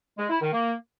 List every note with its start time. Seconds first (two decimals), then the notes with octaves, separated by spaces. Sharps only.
0.18 G#3
0.30 E4
0.41 D#3
0.52 A#3